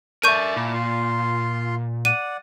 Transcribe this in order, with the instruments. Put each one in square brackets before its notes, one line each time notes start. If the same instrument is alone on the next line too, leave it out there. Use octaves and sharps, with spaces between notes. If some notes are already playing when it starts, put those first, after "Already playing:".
[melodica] A4 D5 A5 [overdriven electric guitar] A#4 E5 [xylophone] C#6 G6 D#7
[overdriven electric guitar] A#2 [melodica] E4 A5 D6
[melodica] F4 C6
[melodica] D5 F#5 [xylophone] D#7